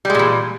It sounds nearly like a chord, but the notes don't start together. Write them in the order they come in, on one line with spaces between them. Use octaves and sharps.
G3 G#3 A#2 E3